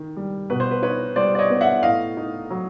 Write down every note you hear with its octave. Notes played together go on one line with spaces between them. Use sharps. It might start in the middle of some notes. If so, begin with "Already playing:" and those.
Already playing: D#3
G3
B2 B4
C5
B4
D#4 B4 C#5
G3 C5 D5
D5
C#5 D#5
B3
E5 F#5
A2 D#5 F5
D#4
F#3